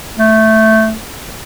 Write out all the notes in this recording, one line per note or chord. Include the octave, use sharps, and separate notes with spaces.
A3